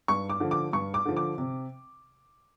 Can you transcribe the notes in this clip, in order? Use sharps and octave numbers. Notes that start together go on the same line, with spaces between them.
G2 C#6
D6
D3 F3
D6
G2 C#6
D6
D3 F3
D6
C3